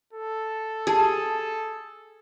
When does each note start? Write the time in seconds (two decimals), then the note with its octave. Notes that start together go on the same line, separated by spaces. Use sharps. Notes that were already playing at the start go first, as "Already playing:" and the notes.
0.13 A4
0.87 G4 G#4 A5